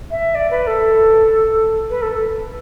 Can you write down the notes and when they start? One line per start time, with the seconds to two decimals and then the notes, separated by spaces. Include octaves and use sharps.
0.11 E5
0.35 D5
0.51 B4
0.67 A4
1.90 B4
2.02 A4